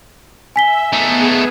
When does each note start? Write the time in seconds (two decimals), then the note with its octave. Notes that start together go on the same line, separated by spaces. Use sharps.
0.56 E5 G#5 B6 G7
0.93 A3 B3 D#4 G#4